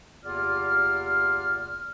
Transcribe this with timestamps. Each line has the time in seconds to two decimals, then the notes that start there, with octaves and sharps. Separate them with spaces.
0.24 E2 C3 A#3 F4 D5 F6